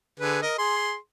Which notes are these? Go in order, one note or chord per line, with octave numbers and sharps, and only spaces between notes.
D3 G#4 B4
A#4 D#5
G#4 C6